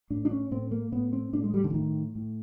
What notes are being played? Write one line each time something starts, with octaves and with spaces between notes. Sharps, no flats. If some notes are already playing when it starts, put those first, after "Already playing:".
A2 D4
D4
C#4
A2 C4
A#3
A2 B3
C4
A2 D4
G#3
G3
D3
E3
A2 D#3
A2